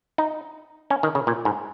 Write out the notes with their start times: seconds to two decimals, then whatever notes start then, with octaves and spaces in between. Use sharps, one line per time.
0.18 D#4
0.90 C#4
1.03 D#3
1.15 C#3
1.27 A#2
1.45 G#2